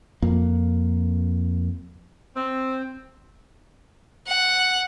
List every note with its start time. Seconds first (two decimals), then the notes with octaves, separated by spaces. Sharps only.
0.22 F2 A#3
2.35 C4
4.27 F#5